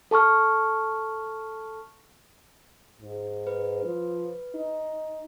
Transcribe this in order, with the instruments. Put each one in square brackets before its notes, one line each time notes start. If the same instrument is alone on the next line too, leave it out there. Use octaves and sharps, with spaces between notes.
[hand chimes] A4 A5 C#6 F6
[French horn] G#2
[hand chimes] B4
[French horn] F3
D#4